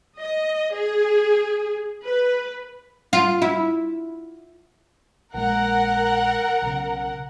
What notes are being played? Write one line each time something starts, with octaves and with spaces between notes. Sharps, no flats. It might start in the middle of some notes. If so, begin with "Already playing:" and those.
D#5
G#4
B4
F4
E4
A#1 G#3 A#4 F#5
B1 C#3